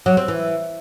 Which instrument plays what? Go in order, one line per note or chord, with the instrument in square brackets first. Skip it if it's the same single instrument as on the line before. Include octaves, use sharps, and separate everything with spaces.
[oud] F#3
C4
E3